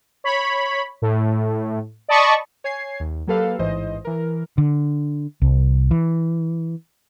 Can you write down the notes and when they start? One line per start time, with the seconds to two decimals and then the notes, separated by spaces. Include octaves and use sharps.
0.24 C#5 B5
1.02 A2
2.08 D5 D#5 A5 B5 C#6 D#6
2.64 C#5 G#5 G#6 C7
3.00 D#2
3.27 F#3 A#3 G4 A4 B4 F5
3.59 A1 G#2 E3 C5 D#5
4.05 E3 A#4
4.58 D3
5.42 C2
5.91 E3